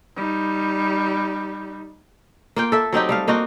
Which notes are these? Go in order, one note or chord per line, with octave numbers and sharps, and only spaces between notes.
G3 D#4
A#3 F4 G5
A4 E5
F#3 C4 D#4 G4
G3 A3 F5
A#3 D#4 F4 F#4